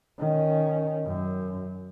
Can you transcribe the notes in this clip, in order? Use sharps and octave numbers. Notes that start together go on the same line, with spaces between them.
D#3 C#4
F#2